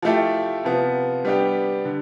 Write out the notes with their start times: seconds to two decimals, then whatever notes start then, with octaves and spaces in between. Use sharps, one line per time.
0.02 F3 A3 E4 G4
0.64 C3 F3 B3
1.25 G3 B3 D4 G4
1.85 D3